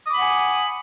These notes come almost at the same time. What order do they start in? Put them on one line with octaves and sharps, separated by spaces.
D#6 D6 B5 F#5 G#5